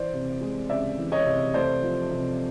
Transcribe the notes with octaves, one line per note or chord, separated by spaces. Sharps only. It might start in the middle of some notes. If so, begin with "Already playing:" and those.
Already playing: E3 C5 D5
C3
G#3
C#2 D5 E5
E3
C#5 D#5
C3
A3 C5 D5
F3
C3